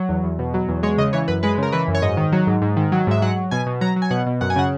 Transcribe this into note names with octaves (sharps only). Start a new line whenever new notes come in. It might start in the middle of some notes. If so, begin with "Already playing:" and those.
Already playing: F#3
E2
E2
B2
F#3
E2
G#3 C#5
C#3 D#5
E3 C#5
F#2 B4
G#3 B4
C#3 A#4
E3 B4
F#2
C#5
G#2 D#5
D#3
F#3
G#2
G#2
D#3
F#3
G#2 E5
F#3 F#5
F#3
B2 G#5
B2
F#3 A#5
F#3
G#5
B2 F#5
B2
F#2 F#5
G#5
C#3 F#5